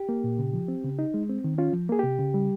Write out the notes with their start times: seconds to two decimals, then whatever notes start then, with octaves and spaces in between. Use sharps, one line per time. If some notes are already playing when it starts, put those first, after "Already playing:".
Already playing: G4
0.09 A#3
0.24 A#2
0.39 C#3
0.54 F3
0.68 C4
0.84 C#3
0.99 D#4
1.14 G#3
1.29 C4
1.44 D#3
1.58 C#4 F4
1.73 F3
1.89 A#3 G#4
1.99 C3 G4
2.19 C#3
2.34 G3